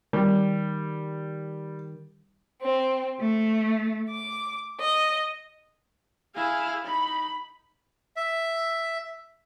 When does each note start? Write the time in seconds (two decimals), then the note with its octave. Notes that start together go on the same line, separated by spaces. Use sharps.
0.13 D#3 G3
2.63 C4
3.20 A3
4.11 D6
4.80 D#5
6.36 E4 G#4 F5
6.86 D#4 B5
8.16 E5